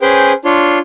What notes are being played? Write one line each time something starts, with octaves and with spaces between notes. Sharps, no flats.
C#4 G#4 B4 C5 G5 G6
D4 F4 C#5 C6